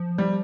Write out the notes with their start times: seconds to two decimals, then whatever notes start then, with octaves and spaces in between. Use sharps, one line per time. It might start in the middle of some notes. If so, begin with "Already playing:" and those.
Already playing: F3
0.18 G3